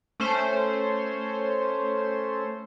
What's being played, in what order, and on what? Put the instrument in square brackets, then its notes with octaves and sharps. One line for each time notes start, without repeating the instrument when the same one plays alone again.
[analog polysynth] A3 C#4 C5